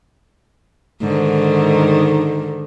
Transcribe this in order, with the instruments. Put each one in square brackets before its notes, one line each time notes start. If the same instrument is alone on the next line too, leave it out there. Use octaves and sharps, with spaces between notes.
[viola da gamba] G#2 D3 D#3